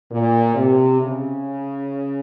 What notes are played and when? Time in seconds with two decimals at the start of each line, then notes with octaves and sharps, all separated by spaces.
0.12 A#2
0.55 C3
0.99 C#3